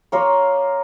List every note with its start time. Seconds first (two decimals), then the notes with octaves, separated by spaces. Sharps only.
0.12 A#3 F4 A#4 C#5